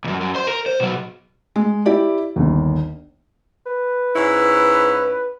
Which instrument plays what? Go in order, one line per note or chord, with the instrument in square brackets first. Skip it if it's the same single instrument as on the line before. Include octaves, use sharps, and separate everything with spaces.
[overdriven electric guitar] C#2 F#2
F#2
C5 C6
A#4
C5
B2 F#3
[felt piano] G#3
E4 G4 D5
G1 D#2
[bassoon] B4
[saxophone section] G#2 C#4 E4